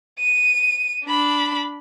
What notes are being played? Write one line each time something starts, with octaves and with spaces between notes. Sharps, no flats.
D#7
D4 B5